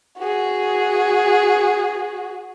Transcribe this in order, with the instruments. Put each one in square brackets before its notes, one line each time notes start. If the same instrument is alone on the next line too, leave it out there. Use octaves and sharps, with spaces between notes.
[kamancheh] F#4 G#4